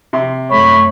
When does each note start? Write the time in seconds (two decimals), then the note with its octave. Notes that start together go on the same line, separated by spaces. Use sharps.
0.13 C3 C6
0.50 F#2 A3 C#5 B5